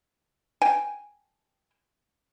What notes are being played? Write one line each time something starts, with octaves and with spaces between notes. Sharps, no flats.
G5 G#5